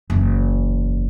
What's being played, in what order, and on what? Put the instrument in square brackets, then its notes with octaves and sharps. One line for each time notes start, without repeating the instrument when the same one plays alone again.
[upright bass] F#1 E2